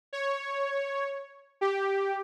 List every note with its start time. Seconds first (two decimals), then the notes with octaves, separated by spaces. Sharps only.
0.13 C#5
1.61 G4